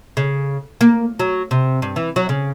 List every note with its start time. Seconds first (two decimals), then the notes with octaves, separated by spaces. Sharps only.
0.17 C#3
0.81 A#3
1.19 F#3
1.51 C3
1.82 G2
1.96 E3
2.16 F#3
2.29 C#3